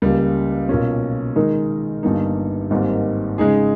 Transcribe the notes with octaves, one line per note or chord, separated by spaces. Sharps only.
C#2 C#3 G3 A#3
B1 A#2 A#3 C#4
D#3 G#3 D#4 A#4
G1 G2 G3 A#3 D#4
G#1 G#2 G3 A#3
C#3 G#3 D#4 G#4